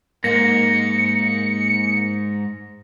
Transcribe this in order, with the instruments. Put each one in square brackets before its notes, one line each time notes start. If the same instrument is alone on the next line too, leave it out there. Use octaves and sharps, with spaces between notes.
[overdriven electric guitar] G#2 [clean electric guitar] A#3 [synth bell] A#6 [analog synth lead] C#7